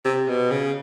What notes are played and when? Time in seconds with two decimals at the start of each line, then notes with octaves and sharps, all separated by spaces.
0.05 C3
0.28 B2
0.51 C#3